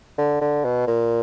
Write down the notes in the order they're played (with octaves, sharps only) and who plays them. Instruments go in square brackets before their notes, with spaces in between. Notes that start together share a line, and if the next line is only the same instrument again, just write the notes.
[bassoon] D3
D3
B2
A#2